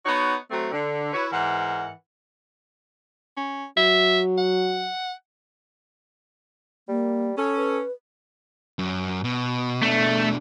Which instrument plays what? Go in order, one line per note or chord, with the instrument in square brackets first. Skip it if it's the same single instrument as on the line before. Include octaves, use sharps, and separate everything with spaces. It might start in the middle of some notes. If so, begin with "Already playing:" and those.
[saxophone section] B3 D#4 F#4 C#5
F#3 A3 C4
D3
E4 F#4 B4 C#5
G#2 E3 A#4 F#5
[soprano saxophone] C#4
[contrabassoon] F#3 [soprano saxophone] E5
[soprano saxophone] F#5
[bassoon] G3 [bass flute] A#3
[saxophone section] C#4 [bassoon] A4
[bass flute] B4
[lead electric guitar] F#2
B2
[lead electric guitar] B2 D4 [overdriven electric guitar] A3